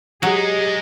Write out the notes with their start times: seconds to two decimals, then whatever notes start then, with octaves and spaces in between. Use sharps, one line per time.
0.23 F#3 G#3 D#4 G4 G#4